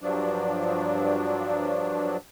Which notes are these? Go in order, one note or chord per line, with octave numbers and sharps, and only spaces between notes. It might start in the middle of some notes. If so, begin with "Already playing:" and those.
G2 F3 F#3 D4